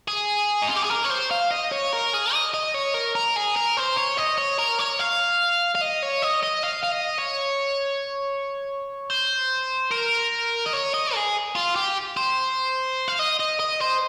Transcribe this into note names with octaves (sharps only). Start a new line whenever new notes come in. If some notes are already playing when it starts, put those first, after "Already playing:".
G#4
D#4
F4
G4
G#4
A#4
C#5
C5
F5
D#5
C#5
A#4
G#4
D#5
D#5
C#5
A#4
A#4
G#4
A#4
C5
C#5
D#5
C#5
A#4
C#5
F5
F5
D#5
C#5
D#5
D#5
F5
F5
D#5
C#5
C5
A#4
D#5
C#5
D#5
G#4
F4
G4
C5
F5
D#5
D#5
D#5
C5